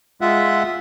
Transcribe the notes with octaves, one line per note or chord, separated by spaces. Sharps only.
G#3 F4 E5 F#5